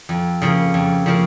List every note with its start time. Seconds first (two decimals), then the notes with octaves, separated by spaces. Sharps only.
0.09 F2
0.42 C#3 F3 A#3
0.74 F2
1.06 C#3 F3 A#3